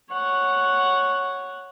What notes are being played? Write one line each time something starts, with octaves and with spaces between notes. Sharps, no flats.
C#5 F#5